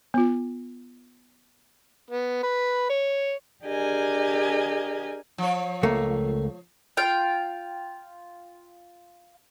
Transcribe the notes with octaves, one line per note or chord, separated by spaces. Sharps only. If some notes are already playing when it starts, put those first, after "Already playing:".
B3 F4
B3
B4
C#5
D4 G4 G#4 A#4 D#5 G#5
F3 C#5
C#2 A3 A#3
F4 G5